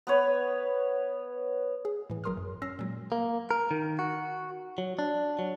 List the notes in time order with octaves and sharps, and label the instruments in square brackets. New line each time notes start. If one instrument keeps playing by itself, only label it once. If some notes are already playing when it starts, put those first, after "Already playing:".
[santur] B3 B4 C#5
[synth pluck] G#4
A2 E3
G#1 F#3 A#4 C6 D#6 F6
F#2
C#4 E6 F6 A#6 C7
A#2 F#3 G#3
[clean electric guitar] A#3
A#4
D#3
F#4
F#3
D4
F#3